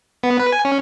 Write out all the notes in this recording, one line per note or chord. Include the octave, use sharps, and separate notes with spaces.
B3
B4
G#5
C#4